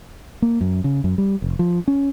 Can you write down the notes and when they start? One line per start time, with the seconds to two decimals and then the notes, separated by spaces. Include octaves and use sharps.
0.42 A#3
0.61 F#2
0.84 C#3
1.04 F#2
1.18 G3
1.42 F1
1.59 F3
1.88 C#4